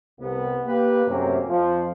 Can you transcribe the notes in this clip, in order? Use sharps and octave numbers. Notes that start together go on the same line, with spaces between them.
C2 B3
A#3 G4 B4
F#2 A2 C3 A#3 C4 C#4
F2 F3